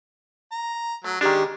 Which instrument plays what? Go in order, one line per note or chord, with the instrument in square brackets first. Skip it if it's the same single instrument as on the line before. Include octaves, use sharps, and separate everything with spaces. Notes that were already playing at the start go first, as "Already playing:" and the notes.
[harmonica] A#5
[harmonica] F#3 [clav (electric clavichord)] A3
[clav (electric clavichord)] D#3 D4 [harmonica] G#3 [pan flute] G4